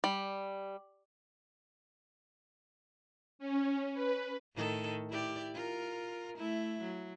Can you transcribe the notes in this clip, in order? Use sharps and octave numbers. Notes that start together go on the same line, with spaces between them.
G3
C#4
B4
A2 D#3 A4
E4 G4 D5
F4 A#4
A3 E4
F#3